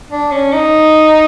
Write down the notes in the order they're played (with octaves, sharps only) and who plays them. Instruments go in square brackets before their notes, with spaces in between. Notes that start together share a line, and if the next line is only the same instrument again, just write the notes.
[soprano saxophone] D4
C#4
D#4